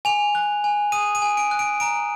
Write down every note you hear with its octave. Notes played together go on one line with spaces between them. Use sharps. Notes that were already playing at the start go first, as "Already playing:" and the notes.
G#5 F7
F#6
G#5
D#6 D#7
D#7
G#5
D7
F#6
D7
A#5 D7